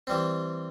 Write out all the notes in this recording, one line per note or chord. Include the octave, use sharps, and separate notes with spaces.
E3 G3 C4